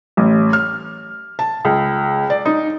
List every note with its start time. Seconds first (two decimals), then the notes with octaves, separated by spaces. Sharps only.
0.17 A1
0.53 F6
1.39 A5
1.65 C#2
2.30 D5
2.45 D#4